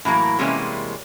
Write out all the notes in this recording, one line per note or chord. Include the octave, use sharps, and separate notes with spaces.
A2 E3 F#3 A#3
C3 E3 G3 G#3 A#3 C#4